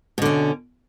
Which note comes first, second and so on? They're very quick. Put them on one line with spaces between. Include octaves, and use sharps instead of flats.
B2 D3 C#4